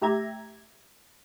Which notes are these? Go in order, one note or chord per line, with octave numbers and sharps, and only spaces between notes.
A2 G4 E5 A#5 G#6